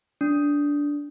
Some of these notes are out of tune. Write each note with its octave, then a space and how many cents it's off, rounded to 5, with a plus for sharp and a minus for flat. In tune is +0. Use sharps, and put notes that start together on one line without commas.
D4 -15